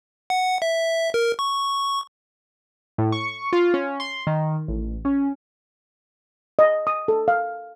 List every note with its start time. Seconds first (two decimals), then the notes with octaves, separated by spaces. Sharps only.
0.30 F#5
0.62 E5
1.14 A#4
1.39 C#6
2.98 A2
3.12 C#6
3.53 F4
3.74 C#4
4.00 C6
4.27 D#3
4.68 A1
5.05 C#4
6.59 D#5
6.87 D#6
7.08 A4
7.28 F5